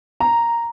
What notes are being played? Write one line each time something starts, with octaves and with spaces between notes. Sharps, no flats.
A#5